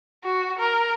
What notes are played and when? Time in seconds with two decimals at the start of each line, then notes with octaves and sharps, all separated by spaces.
0.24 F#4
0.59 A#4